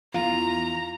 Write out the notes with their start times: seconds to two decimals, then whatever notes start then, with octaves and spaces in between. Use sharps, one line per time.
0.14 E2 E3 F4 A#5